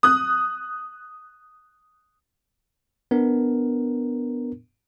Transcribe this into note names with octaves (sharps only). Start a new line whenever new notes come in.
D#6 F#6
B3 D4 A#4